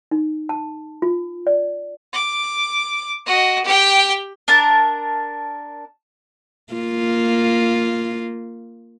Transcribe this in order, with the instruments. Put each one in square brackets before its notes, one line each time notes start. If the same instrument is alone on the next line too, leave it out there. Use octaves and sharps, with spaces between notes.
[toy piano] D#4
A5
F4
D5
[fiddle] D6
F#4 D#5
G4 G5
[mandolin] D4 A#4 A5
[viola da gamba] A#3 F4